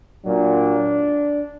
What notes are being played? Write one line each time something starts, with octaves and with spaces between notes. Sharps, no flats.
A#2 F#3 D4